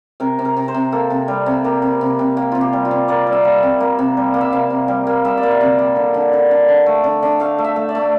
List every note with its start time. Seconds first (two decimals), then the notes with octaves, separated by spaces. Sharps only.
0.20 C3 A#4
0.39 C3
0.45 A#4
0.56 C3
0.68 C5
0.74 C3
0.92 A#3 A4
1.10 C3
1.28 G3
1.46 C3
1.64 A#3 G4
1.82 C3
2.01 C3
2.19 C3
2.37 A#3 G4
2.52 C3 F4
2.61 G4
2.73 G3
2.85 F4
2.91 C3
3.08 A#3 D5
3.27 G3
3.33 E5
3.45 G3
3.63 C3
3.80 A#3
3.99 C3
4.17 G3
4.34 A#3
4.41 E5
4.53 C3 F5
4.70 C3
4.88 G3
5.07 A#3
5.25 G3 E5
5.38 D5
5.43 A#3
5.51 E5
5.61 C3
5.79 A#3
5.96 D3
6.14 D3
6.33 D3
6.51 D3
6.68 D3
6.86 A3
7.04 D3
7.23 D3
7.40 A3 F5
7.59 A3
7.65 E5
7.76 A3
7.89 D5
7.95 A3